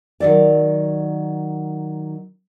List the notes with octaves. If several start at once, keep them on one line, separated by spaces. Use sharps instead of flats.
D#3 F#3 D5